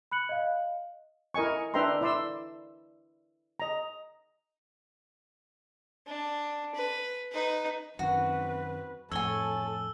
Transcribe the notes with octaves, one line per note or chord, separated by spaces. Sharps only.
B5 F#6 C#7 F#7
D#5 F5
E4 A#4 D#5 G#5 C#6
D4 B4 E5 G5 A#5 C6
E4 D5 E5 C6 E6
D#5 A#5
D4
B4
D#4 B4
F#2 D#3 C4 F#4 B4
F2 A2 A4 C#5 G#5 E6 G7